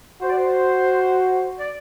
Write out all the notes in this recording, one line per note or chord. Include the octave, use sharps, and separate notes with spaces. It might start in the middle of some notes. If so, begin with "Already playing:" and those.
F#4 C5
D5
C5
D5